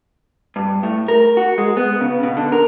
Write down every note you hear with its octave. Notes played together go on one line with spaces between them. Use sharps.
G2
A2
A#4
F#4
G#3
B3
C#3
B2
D3
A#4